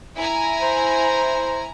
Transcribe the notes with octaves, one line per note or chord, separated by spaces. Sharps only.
E4 G#5 A#5
C5